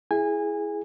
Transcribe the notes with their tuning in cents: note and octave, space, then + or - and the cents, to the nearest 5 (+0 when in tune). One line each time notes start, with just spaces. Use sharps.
E4 +0 G#4 +5 G#5 -25